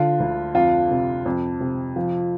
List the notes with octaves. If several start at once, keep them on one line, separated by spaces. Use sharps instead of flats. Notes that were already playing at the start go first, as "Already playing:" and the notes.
Already playing: D3 F4
D2
F2 F4
C3
F2
C3
F3